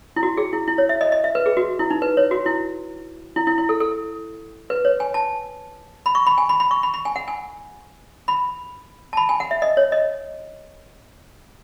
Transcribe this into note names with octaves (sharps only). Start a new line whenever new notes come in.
E4
F#4
G#4
E4
E4
C#5
E5
D#5
D#5
E5
B4
G#4
F#4
E4
D#4
B4
C#5
F#4
E4
E4
E4
E4
A4
A4
B4
C#5
G#5
A5
B5
C#6
B5
G#5
B5
B5
C#6
B5
B5
G#5
F#5
G#5
B5
A5
B5
G#5
F#5
E5
D#5
C#5
D#5